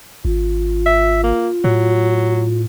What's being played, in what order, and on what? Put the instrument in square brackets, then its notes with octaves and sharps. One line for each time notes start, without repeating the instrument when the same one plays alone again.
[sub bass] G#1 [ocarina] F4
[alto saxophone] E5
A#3
[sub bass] A2 [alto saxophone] F#3